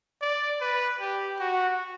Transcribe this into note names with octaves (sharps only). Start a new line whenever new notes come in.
D5
B4
G4
F#4